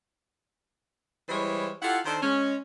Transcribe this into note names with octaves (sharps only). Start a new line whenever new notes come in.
E3 G3 G#3 E4 C5 C#5
E4 F4 G4 A4 F#5
D#3 D4 A4 C5
G#3 C#4